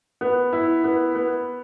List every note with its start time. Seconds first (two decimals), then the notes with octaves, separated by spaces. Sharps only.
0.21 B3
0.53 E4
0.84 B3
1.15 B3